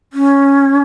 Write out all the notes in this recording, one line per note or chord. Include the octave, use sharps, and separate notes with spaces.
C#4